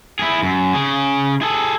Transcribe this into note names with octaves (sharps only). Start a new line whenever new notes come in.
E4 G#4
F#2
C#3 G#4
G#4 A4